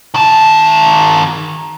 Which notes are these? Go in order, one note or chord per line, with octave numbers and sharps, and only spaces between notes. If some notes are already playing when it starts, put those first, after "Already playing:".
D#3 A5